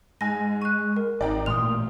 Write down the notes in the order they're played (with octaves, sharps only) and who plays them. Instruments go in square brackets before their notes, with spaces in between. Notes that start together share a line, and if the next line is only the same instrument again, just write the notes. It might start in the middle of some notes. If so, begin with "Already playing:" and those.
[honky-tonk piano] G#2 G#5 [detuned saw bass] G#3 [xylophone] A#6
[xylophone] C#6 F#6 [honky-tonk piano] D#7
[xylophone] A#4
[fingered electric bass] G#1 [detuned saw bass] D#4 [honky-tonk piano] D5 G5 A#5
[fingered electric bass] A1 A3 [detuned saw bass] A#2 [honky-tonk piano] G5 C6 F6 [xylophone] D#6 F7